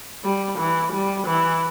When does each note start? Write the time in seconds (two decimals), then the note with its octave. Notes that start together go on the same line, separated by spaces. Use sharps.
0.24 G3
0.59 E3
0.93 G3
1.27 E3